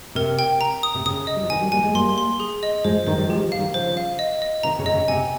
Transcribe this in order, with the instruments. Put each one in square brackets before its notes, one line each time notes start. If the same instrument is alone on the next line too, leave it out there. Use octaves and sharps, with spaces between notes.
[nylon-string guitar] C3 [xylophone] A#4
[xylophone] G5
A#5
D#6
[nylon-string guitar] C3
[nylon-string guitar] C#3 [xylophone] D#6
[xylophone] D#5
[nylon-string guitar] G3
F3
[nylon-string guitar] C3 D#3 [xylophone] G#5
[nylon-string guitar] D#3 G3
[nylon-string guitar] G3 A#3 [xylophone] G#5
[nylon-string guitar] F3 G#3
[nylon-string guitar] G3 A#3 [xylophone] C6
[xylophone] C6
G#4
D#5
[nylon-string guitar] F3 G#3 [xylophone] C5
[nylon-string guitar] D#3 G3 [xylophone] C5
[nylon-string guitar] D#3 G3
[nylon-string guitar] F3 G#3 [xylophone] G4
[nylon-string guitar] G#3 [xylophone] F5
[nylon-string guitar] D#3 G3
[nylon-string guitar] C#3 F3 [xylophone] C5
[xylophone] F5
D#5
D#5
[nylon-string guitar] C3 D#3 [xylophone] A#5
[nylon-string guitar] C#3
[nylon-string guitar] C3 [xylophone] D#5
[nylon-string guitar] C#3
[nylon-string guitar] C3 [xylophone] G#5